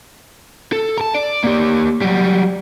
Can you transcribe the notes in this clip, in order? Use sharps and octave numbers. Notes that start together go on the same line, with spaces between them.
A4
A5 A#5
D5
A#3 G4
F#3 G3